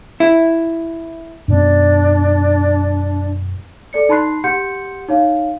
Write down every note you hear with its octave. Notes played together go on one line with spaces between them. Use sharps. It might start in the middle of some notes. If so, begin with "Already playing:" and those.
E4
F#2 B2 B3 D4
A4 D5 C#7
D#4 A5 B5 C6 F#6 C7
G4 F#5 C6 G6 C#7
D#4 C#5 F5